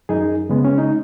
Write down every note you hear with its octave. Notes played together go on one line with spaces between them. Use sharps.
F#2 D#4 G#4
C#3 G#3 B3
C#4
D#4